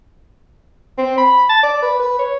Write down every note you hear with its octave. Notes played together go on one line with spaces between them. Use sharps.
C4
B5
A5
D5
B4
B4
C#5